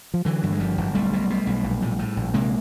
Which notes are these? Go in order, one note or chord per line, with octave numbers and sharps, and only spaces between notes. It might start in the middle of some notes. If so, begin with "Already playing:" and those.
F3
D3 E3 F#3
G2
G#3
G1 F3 G3
G1
B1 G3 A3
B2
B2
B1
A#1
A2
A2
A#1
C3 G#3 A#3